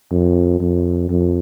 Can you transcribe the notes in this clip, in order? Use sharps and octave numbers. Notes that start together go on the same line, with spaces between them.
F2
F2
F2